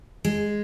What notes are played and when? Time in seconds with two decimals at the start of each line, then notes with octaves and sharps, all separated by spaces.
0.25 G#3